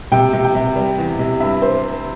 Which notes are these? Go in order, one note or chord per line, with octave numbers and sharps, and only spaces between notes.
C3 G5
C3
G5
C3
G3
E2
C3
G2 E5
C5